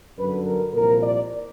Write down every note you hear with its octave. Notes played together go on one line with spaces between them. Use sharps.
G1 F#2 D3 F#3 B4
A#4
C2 A#2 F3 A#4
D5